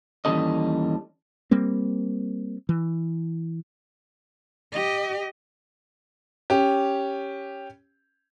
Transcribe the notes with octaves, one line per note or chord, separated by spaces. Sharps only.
D#2 E3 G3 C#4 A4 D#5
G3 A#3 C4
E3
G4 D#5
C#4 G4